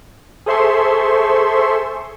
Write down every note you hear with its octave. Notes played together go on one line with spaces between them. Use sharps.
G#4 A4 C5 E5 C6 C#6